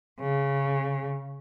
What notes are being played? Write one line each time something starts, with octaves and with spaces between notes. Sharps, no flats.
C#3